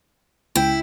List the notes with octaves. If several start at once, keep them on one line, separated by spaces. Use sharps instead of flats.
C#2 E4 G5